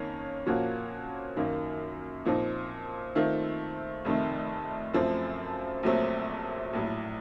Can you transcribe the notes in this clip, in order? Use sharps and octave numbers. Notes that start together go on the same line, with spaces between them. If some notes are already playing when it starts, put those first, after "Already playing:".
Already playing: F2 D#3 A#3 C#4
A#2 F3 A#3 C#4 F#4
F#2 D#3 A#3
A#2 F3 C4 D#4
D#3 A3 C4 F4
F1 F2 D#3 A3
F#2 F3 A3 C4
A#1 A#2 F#3 A3 C4
A#1 A2 F#3